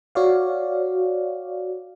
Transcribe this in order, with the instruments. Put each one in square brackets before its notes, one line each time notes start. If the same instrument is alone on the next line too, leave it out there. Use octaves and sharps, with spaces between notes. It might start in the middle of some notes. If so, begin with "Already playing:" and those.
[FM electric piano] F#4 C#5 D5 F5